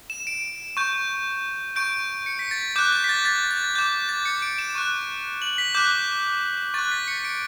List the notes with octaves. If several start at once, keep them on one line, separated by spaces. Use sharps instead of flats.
E7
D7
C#6 G6
C#6 G6 D7
C#7
B6
A6
D6 F#6 G6
G6
B6
A6
A6
A6
D6 G6
A6
C#7
D7
E7
C#6 F#6
F#7
B6
D6 F#6 G6
C#6 F#6 A6
B6
C#7
D7